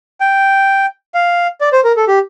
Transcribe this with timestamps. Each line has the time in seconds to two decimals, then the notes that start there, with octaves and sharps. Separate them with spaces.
0.20 G5
1.14 F5
1.61 D5
1.72 C5
1.84 A#4
1.97 A4
2.08 G4